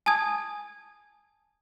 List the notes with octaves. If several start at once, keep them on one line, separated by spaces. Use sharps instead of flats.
G#5 A5 D#6 G#6